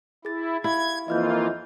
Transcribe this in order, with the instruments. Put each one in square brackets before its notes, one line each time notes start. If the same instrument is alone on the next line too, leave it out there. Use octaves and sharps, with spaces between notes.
[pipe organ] E4 [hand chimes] G#4 A6
[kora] E4 [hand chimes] G4 E5 F5 [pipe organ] G#6
[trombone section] F2 E3 [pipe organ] A#3 F4 [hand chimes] D#5 F6 G6